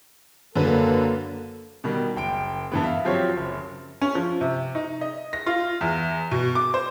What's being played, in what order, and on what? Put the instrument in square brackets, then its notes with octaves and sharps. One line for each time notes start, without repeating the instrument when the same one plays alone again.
[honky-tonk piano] F#2 D3 B4 [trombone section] A#3 A4
[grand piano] B2 D#3 G3
F#1 G5 D7
G2 E3 B3
E5 F5
F3 F#3 C4 F4 G4 C#5
F#1
[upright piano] C#4
F3
C3
D#4
D#5
A#6
F4
E2
B2
D6
C5